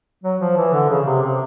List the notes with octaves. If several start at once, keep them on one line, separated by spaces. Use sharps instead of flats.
F#3
F3
E3
D3
C#3
C3
C3